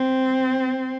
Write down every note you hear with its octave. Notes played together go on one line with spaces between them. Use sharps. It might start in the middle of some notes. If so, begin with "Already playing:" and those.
Already playing: C4